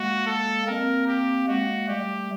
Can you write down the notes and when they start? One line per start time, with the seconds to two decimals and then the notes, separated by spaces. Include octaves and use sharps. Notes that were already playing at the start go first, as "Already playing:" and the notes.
Already playing: G#3 A#3 F#4
0.26 A4
0.67 A#3 C4 A#4
1.07 G4
1.48 G#3 A#3 F#4
1.88 G3 A3 G4